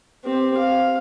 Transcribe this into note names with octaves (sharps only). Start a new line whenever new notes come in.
C4 G4
F5